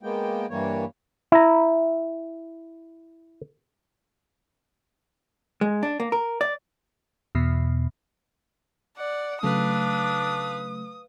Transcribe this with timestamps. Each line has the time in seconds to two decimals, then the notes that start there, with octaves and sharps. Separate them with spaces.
0.03 G#3 A#3 B3 G5
0.50 G2 E3 G3 A#3 C#5
1.32 E4 A#5
5.61 G#3
5.83 D4
6.00 A#3
6.12 A#4
6.41 D5
7.35 E2 B2
8.98 D5 F#5
9.43 C#3 F#3 A3 D4 B4 F5 D#6